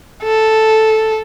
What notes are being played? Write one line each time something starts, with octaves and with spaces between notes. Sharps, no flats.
A4